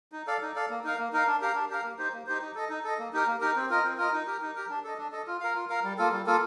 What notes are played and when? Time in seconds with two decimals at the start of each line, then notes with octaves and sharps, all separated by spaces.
0.12 D#4
0.27 A4 D5 F5
0.42 D#4
0.55 A4 D5 F5
0.69 A#3
0.84 D#4 A#4 F5
0.99 A#3
1.13 D#4 A#4 F5
1.27 D4
1.41 G4 A#4 F5
1.55 D4
1.70 G4 A#4 F5
1.84 A#3
1.98 D#4 G4 C5
2.13 A#3
2.27 D#4 G4 C5
2.42 D#4
2.55 A4 D#5
2.69 D#4
2.84 A4 D#5
2.99 A#3
3.13 D#4 G4 A#4
3.26 A#3
3.41 D#4 G4 A#4
3.56 C4
3.70 F4 A#4 D#5
3.84 C4
3.98 F4 A#4 D#5
4.13 D#4
4.27 G4 A#4
4.41 D#4
4.56 G4 A#4
4.70 D4
4.84 A4 D#5
4.98 D4
5.12 A4 D#5
5.27 F4
5.40 A#4 F5
5.55 F4
5.70 A#4 F5
5.84 G3
5.98 A#3 F4 A4
6.12 G3
6.26 A#3 F4 A4